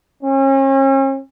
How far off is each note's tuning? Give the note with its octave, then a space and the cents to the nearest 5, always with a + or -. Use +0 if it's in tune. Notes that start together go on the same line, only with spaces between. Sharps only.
C#4 -40